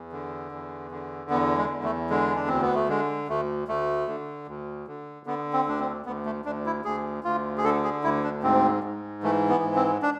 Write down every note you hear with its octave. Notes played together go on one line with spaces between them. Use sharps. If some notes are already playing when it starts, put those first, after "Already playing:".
Already playing: E2
D3
E2
D3
E2 B3
G#3
E2
A3
D3 G#3
D4
D2 C4
B3
A3
D3 G#3
D2 A3
D2 A3
D3
D2
D3
D3 B3
C4
D2 D4
C4
D2 B3
A3
D2 D4
E4
D2 G#4
D2 F4
G#4
D3 A4
G#4
D2 E4
D4
G#2 C4
G#2
E3 A3
B3
G#2
C4
D4